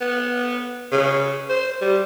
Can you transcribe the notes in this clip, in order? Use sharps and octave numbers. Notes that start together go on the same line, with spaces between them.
B3
C#3
C5
G3